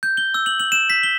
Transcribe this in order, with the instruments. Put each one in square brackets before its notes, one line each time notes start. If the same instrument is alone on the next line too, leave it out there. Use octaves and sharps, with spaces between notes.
[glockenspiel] G6
G7
E6
F#7
F#7
E7
B6
G7